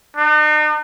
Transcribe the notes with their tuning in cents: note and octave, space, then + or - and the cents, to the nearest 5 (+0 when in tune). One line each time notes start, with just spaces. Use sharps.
D#4 -45